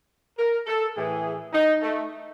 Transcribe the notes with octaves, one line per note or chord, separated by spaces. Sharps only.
A#4
A4
A2 E3 G#4
D#4
A3